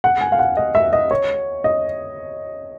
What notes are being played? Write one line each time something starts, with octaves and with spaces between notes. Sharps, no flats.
F#5
G#5
F5
F#5
D#5
E5
D#5
C#5
D#5